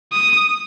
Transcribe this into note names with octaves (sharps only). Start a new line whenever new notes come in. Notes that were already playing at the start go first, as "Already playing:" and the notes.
D#6